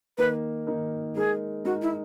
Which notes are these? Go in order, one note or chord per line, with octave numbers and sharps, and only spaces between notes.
D#3 A#3 D#4 A#4 B4
D#3 A#3 D#4 A#4
G#3 D#4 G#4 A#4
G#3 D#4 F#4 A#4
E4